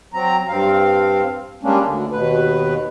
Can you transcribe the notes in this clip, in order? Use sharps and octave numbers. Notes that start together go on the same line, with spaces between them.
F#3 C4 A#5
G2 C4 F5
G3 G#3 A#3 C#4 D4
D2 D3
D#2 B2 B4